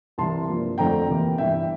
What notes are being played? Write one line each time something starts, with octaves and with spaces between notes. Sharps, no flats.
C2 C3 E3 A5 C6
G2 F3 A#3
F2 D3 A3 C4 G5 A#5
E2 C3 E3 A#3
G1 G2 E3 E5 G5